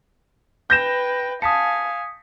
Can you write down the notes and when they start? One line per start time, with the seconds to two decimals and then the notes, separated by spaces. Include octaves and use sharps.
0.70 B4 G5 G6 A#6 E7
1.42 F5 G#5 A5 D#6 B6 C#7